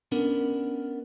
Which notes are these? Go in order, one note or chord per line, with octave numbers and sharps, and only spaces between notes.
B3 C#4 D4 A#4